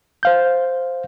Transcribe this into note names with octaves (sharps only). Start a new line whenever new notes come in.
C5 F5 G6